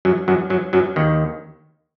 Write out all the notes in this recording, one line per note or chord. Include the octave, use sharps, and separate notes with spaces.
F#2 F#3
F#2 F#3
F#2 F#3
F#2 F#3
D#2 D#3